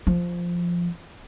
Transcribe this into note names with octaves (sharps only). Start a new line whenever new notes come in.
F3